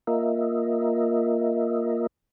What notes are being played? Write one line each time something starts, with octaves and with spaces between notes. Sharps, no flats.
A#3 F4 A#4 D#5 E5